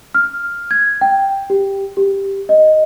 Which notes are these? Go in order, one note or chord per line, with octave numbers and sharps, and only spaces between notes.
F6
G#6
G5
G4
G4
D#5